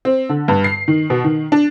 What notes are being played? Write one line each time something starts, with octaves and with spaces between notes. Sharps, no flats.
C4
D3
G2
C7
D#3
B2
D#3
D4